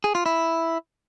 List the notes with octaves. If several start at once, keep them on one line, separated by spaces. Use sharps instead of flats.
G#4
F4
E4